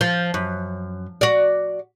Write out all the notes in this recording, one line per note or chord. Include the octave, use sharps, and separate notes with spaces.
F3
F#2
F#4 D5